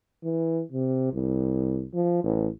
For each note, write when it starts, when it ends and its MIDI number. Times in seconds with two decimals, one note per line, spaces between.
0.24 0.62 52
0.72 1.12 48
1.13 1.85 36
1.94 2.21 53
2.23 2.48 33